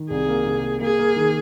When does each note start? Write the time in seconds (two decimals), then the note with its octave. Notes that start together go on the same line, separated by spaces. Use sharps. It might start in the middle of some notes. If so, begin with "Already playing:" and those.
Already playing: D#3
0.10 C2 G#4
0.28 A#3
0.46 C3
0.63 A#3
0.81 A#3 G#4
0.99 A#3
1.16 D#3